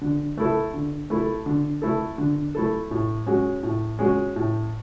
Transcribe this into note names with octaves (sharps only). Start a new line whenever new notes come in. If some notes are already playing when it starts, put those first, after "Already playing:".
D3
A3 E4 A4
D3
A3 E4 A4
D3
A3 E4 A4
D3
A3 E4 A4
A2
G#3 C#4 F#4
A2
G#3 C#4 F#4
A2